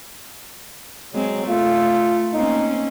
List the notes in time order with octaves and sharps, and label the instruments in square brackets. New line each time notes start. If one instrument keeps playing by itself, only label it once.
[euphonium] F#3 [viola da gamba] G#3 C4
[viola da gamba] A3 [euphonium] F4
[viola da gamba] A#3 C4 C#4 [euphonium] D#4